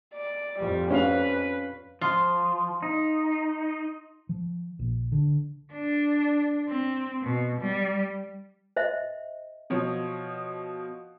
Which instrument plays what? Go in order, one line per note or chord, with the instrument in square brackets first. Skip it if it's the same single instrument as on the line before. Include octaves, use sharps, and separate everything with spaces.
[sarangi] D5
[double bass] F2 F3 [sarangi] G3
[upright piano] C#4 F5 F7 [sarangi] B4
[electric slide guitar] F3 [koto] F4
[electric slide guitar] D#4
[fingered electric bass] F3
A#1
D3
[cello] D4
C4
B2
G3
[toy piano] C5 D#5 E5
[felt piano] B2 F3 C#5